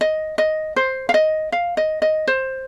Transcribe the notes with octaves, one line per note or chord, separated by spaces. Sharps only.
D#5
D#5
C5
F5
D#5
F5
D#5
D#5
C5